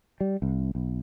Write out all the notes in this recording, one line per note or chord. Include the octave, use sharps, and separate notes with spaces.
G3
C2
B1